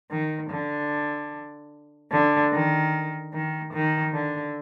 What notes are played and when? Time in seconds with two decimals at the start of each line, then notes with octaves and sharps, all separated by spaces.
0.11 D#3
0.50 D3
2.12 D3
2.52 D#3
3.33 D#3
3.73 D#3
4.13 D3